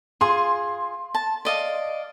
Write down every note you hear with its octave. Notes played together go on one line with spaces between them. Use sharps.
F4 G#4 C6
A5
D5 D#5 F5